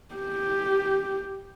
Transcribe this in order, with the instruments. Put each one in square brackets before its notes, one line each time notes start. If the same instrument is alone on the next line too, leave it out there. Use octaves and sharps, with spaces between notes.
[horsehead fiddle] G4